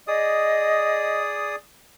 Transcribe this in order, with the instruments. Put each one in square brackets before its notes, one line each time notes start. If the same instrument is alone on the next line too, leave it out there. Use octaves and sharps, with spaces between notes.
[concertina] G#4 D5 D#6 [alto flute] D#5